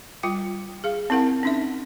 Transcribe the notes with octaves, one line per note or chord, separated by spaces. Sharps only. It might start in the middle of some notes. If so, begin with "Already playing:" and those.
G3 F4 G5
G#4 F5
C4 E4 A#4 F#5
C#4 D#4 E5